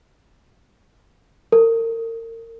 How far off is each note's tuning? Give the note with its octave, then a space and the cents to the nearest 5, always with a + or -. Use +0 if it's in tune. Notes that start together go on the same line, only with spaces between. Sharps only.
A#4 -35